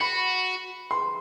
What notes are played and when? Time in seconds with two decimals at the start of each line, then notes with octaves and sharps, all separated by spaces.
0.01 F#4 B5
0.91 C6